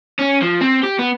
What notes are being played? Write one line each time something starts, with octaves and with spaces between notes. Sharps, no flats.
C#4
F3
C4
G4
B3